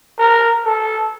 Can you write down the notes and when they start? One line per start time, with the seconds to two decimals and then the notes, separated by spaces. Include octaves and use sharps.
0.19 A#4
0.65 A4